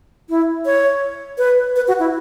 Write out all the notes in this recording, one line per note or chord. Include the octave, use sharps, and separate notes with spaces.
E4
C#5
B4
B4
F#4
E4